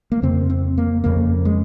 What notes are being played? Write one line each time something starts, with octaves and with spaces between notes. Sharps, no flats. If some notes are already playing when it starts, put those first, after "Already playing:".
A#3
F2 C#3 C4
C4
A#3
F2 C#3 A#3
G#3